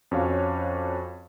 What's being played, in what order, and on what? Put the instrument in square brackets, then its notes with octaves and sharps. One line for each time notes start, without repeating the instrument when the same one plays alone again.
[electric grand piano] F2 C#4 F#4 C#5 F5